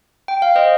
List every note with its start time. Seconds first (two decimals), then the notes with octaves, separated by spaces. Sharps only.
0.28 G5
0.42 F5
0.55 C5 D#5